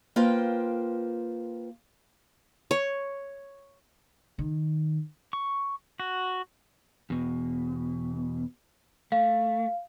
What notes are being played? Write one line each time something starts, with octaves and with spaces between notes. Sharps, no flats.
A#3 F4 B4 C5 G5
C#5
D#3
C#6
F#4
E2 B2
A3 F5